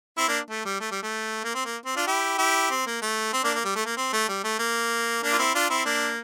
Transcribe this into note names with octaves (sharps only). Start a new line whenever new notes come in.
C4 E4
A#3 D4
A3
G3
A3
G3
A3
A#3
C4
A#3
C4
D4 F4
E4 G4
E4 G4
C4
A#3
A3
C4
A#3 D4
A#3
G3
A3
A#3
C4
A3
G3
A3
A#3
A#3 D4
F4
C4 E4
D4 F4
C4 E4
A#3 D4